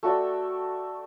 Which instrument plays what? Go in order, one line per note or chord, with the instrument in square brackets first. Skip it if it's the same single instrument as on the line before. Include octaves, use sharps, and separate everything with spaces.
[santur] A3 F#4 D5 G5